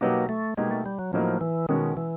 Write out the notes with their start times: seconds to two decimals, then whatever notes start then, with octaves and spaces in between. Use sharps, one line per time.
0.01 B2 F#3 A#3 B3 D#4 G4
0.29 A3
0.57 B2 G3 G#3 A#3 D#4 G4
0.71 A3
0.86 G3
0.99 F#3
1.13 A2 F3 F#3 A#3 D#4
1.41 E3
1.69 B2 D#3 G#3 C#4 F#4
1.97 E3